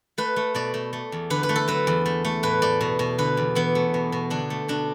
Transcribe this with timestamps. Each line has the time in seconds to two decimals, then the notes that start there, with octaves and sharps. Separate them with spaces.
0.18 A3 B4
0.36 A3
0.55 B2 D5
0.74 A3
0.93 A3
1.12 E2
1.30 D3 B4
1.43 B4
1.49 A3
1.56 A4
1.68 F#3 B4
1.87 E2
2.06 A3
2.25 A3
2.43 A2 B4
2.62 A3 D5
2.81 B2
2.99 B2
3.18 D3 B4
3.37 E2
3.55 E3 B3
3.75 A3
3.94 B2
4.12 B2
4.30 D3 D4
4.50 A3
4.68 B2 D4